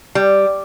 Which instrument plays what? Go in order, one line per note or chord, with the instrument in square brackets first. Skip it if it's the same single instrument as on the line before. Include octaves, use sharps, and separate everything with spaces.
[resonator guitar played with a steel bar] G3